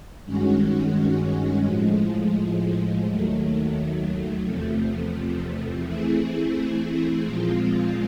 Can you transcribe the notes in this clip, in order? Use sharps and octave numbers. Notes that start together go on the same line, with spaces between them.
G2 D#3 G#3 C#4 F#4
A2 F3 G#3
D#2 D#3 F#3 A3
E2 C3 F3 A3
E3 A3 C4 E4 G#4
A#2 F3 G#3 C4 F4